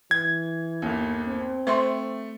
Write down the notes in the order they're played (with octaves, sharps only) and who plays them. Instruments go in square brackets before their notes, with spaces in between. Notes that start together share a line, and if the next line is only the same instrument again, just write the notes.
[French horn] E3 [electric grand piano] G#6
[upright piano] G1 D#2
[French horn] C4
[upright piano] A3 [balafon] C5 E5 C6